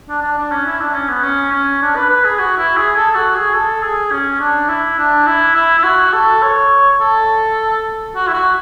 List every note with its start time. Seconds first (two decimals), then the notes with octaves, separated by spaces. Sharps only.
0.09 D4
0.22 D4
0.38 D4
0.52 C#4
0.66 E4
0.81 D4
0.94 C#4
1.09 B3
1.23 C#4
1.52 C#4
1.82 D4
1.96 B4
2.10 B4
2.25 G#4
2.39 F#4
2.57 E4
2.77 G#4
2.96 A4
3.15 F#4
3.35 G#4
3.54 A4
3.83 G#4
4.12 C#4
4.40 D4
4.69 E4
4.99 D4
5.27 E4
5.55 E4
5.78 E4
5.84 F#4
6.13 A4
6.43 C#5
7.00 A4
8.15 F#4
8.27 E4
8.33 F#4